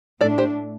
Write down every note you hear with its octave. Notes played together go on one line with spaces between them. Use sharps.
A2 A3 D4 A4 D5
G4 C5